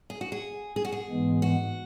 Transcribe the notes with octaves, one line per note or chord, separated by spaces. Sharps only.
G#4
F#4
G#4
G#4
F#4
G#4
G#2 E3 G#3 B3
F#4